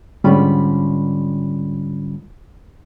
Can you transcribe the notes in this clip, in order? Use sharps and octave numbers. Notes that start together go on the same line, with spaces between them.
G#2 D3 G3 C#4 F4 B5